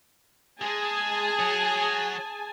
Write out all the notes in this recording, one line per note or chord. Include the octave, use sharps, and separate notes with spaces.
G#3 G#4 G#5 A5
F#4 C#5